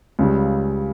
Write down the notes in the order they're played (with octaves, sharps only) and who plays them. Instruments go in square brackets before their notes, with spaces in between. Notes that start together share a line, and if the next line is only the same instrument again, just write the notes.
[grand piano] C#2 C#3 G3